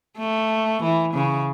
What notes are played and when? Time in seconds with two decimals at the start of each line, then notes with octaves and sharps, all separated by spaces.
0.18 A3
0.83 E3
1.14 C#3